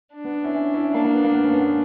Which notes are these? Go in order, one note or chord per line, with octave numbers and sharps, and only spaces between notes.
D4
B3
C#4 E4
C#4 E4
C#4 E4
A#3 D4
A#3
B3
A#3
B3
A#3 C#4
B3